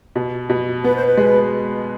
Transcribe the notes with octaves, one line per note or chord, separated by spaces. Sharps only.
B2
B2
B3 B4
C5
B4
G#3